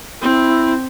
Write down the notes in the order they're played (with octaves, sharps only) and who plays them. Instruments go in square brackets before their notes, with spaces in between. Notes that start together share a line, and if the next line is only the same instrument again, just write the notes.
[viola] C4 [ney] E4